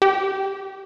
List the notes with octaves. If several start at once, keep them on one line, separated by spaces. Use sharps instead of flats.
G4